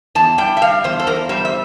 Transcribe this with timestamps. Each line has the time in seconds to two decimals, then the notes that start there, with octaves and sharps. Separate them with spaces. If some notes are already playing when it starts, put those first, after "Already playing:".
0.15 E2 A5
0.38 G3 G5
0.57 E5
0.62 G3 F5
0.84 E2 C5
0.99 A4
1.07 E2 A#4
1.29 G3 C5
1.45 E5